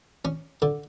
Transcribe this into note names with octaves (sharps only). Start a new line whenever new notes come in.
C#4
D3